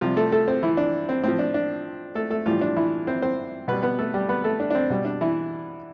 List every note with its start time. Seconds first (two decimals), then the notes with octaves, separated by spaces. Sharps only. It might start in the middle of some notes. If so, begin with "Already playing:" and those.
0.01 C3 F3 G3 F4
0.17 A3 A4
0.32 A3 A4
0.48 C4 C5
0.63 E3 E4
0.77 D4
1.09 C4
1.23 A2 F3 C4
1.39 D4
1.54 D4
2.15 A3 A4
2.30 A3 A4
2.46 A2 E3 F3 G3 F4
2.61 D4
2.76 E3 E4
3.07 C4 C5
3.22 C4 C5
3.68 B2 G3 B3 B4
3.83 B3 B4
3.98 A3 A4
4.14 G3 G4
4.29 B3 B4
4.44 A3 A4
4.60 D4
4.70 D4
4.75 C4
4.90 B2 G3
5.05 D4
5.21 E3 E4